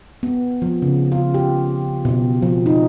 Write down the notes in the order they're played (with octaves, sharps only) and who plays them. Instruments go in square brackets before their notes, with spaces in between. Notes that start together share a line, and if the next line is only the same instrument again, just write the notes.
[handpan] B3
F3
C#3
F4
G4
B2
F3
D#4